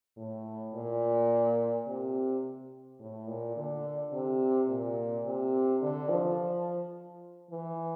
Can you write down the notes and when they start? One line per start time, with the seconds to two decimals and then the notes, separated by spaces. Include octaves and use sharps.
0.17 A2
0.74 A#2
1.87 C3
3.00 A2
3.27 A#2
3.56 D3
4.12 C3
4.68 A#2
5.26 C3
5.82 D3
6.09 F3
7.50 E3